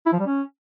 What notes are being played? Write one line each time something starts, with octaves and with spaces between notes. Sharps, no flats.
E4
F3
G3
C#4